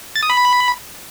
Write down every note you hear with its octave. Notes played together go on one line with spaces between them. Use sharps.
A6
D#6
B5